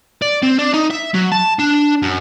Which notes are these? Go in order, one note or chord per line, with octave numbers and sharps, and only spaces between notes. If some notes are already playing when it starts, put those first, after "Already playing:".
D5
C4
D4
D#4
E5
F#3
A5
D4
F#2